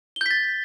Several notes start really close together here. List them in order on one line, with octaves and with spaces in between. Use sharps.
G7 G6 B6 A6